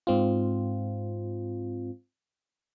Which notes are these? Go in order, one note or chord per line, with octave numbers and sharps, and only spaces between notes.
G#2 C4 F4